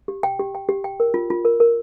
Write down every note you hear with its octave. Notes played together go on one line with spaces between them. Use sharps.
G4
G5
G4
G5
G4
G5
A#4
F4
F4
A#4
A#4